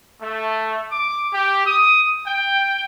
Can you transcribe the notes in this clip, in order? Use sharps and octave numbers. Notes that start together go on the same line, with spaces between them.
A3
D6
G4
D#6
G5